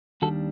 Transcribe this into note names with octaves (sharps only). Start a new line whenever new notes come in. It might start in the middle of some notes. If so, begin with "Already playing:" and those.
D#2 D#3 G3 D4 F#4 A4